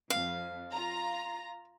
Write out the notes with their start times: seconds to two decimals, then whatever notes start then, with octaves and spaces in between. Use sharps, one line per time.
0.10 F2 F5
0.73 F4 A#5